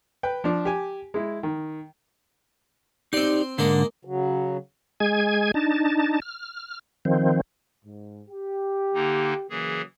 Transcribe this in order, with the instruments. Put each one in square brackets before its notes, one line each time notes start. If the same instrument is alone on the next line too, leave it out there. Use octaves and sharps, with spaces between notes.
[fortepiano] B4 G5
F3 D4
G4 G#5
G#3 E4
D#3
[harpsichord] C4 C6 [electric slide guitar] D#4 G4 D5
[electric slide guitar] G#2 D3 [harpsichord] G#3 A#3
[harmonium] C#3 F#3
[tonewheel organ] G#3 G#4 G#5 G#6
D4 D#4 A5
F6
D#3 F3 C4
[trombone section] G#2
G4
[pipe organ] D3 A#3 D#4
[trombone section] C#3 F#3 A#3 [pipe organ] E3 G#4